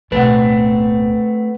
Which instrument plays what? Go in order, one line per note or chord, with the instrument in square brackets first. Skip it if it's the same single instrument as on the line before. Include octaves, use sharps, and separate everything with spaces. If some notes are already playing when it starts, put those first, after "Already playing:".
[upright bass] D1 B2 [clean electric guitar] A3 C4 [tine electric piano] B4 F#5